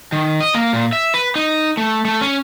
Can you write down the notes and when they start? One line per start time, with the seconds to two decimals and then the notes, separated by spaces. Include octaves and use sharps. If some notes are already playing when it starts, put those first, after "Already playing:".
0.12 D#3
0.40 D#5
0.54 A#3
0.73 A#2
0.93 E5
1.14 B4
1.35 D#4
1.77 A3
2.05 A3
2.21 C#4